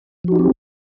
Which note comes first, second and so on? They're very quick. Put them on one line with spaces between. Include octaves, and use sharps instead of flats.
F3 F#4 D#4 G4 C4